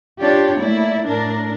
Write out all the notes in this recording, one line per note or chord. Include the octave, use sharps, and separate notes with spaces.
D4 F4 G4 C#5 D5
A3 A#3 E4 D5
A2 D4 A#4